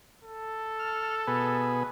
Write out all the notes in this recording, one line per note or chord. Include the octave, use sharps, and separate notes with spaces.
A4
F6
B2 G#4 B4